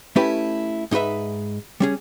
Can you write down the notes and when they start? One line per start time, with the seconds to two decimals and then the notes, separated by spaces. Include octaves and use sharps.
0.16 A3 C#4 E4 G4 B4
0.91 G#2 D#4 F4 B4 E5
1.80 G3 C#4 G#4